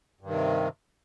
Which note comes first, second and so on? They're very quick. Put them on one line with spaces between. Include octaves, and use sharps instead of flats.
G2 D#3 C3